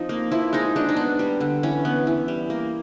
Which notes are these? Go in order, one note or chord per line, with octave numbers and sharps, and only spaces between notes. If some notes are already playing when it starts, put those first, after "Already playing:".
Already playing: F3 C4 D#4
A#3
F3 E4
G#3 D#4
G#3 D4
D#4
B3 D4
G3
D3
E3 C#4
B3
E3
G3
A#3